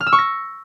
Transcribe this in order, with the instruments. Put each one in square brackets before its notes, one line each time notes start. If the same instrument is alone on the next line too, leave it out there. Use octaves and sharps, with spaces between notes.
[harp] F6
E6
C#6
A#6